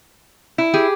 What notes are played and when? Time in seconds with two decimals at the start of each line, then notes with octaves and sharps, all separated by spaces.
0.58 E4
0.74 G4 G#4